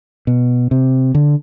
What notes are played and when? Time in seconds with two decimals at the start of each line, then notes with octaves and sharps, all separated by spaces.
0.27 B2
0.71 C3
1.15 D3